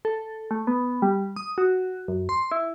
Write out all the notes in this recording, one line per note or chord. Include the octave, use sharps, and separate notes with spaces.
A4
A3
B3
G3
D#6
F#4
F#2
C6
E4